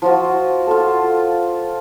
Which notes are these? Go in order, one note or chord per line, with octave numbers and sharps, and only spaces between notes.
F3 F4 F#4
F4 A4